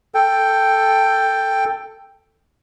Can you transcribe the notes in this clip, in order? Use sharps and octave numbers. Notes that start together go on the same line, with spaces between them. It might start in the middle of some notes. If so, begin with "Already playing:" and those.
A4 G5